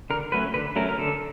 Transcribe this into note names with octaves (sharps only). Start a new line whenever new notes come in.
D3 A#4
F#3 A3 C#4 B4
D3 B4
F#3 A3 C#4 A#4
A#4
D3 A4